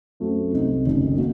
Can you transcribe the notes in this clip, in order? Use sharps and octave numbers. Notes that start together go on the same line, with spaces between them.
F#2 F#3 A3 C4
C2 C3 F#3 A3 D#4
F#1 F#2 D#3 A3
F#3 A#3